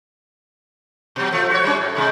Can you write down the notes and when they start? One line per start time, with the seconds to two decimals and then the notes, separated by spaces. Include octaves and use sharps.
1.16 B2 F#3
1.32 F3 A3
1.50 F#4 C#5
1.64 G3 C#4
1.77 A2
1.95 A2 C3 G#3